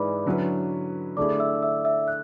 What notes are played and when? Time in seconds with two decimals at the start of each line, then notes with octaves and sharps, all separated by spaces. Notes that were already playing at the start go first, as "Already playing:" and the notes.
Already playing: G#2 E3 G#3 B4 D5 B5 D6
0.26 D3 F#3 C#4 E4 B4
1.17 D3 A3 E4 G#4 D5 D6
1.39 E5 E6
1.62 E5 E6
1.85 E5 E6
2.08 F#6